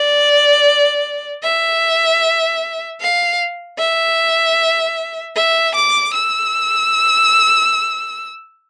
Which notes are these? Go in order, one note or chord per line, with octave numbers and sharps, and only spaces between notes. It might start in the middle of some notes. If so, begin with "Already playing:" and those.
Already playing: D5
E5
F5
E5
E5
D6
E6